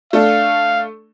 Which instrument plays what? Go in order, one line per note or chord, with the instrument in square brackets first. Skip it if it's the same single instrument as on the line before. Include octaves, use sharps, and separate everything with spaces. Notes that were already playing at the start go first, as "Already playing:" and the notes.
[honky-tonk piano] A3 D4 A4 [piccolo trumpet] F5